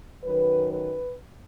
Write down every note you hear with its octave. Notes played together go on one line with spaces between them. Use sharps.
F#2 D#3 F#3 B4
B4